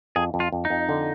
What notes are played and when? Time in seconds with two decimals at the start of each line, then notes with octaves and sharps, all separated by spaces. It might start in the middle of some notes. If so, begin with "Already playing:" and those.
0.16 F2 G#4
0.34 F2
0.40 F4
0.52 F2
0.65 D#4
0.70 F2
0.89 D3